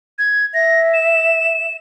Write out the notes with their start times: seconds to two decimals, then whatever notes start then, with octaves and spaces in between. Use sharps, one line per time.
0.19 G#6
0.54 E5 A#6
0.94 E7